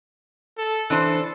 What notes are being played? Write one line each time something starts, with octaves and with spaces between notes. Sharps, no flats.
A4
E3 D4 A4 C5